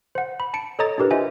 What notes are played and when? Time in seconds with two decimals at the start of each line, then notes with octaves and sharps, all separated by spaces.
0.15 C5 F#5
0.40 B5
0.54 A5 C#7 D7
0.79 A4 C#5 D#5 A#5 D#6 A6
0.98 D4 E4 G4 A#4 B4
1.11 F4 C5 D#5 E5 G#5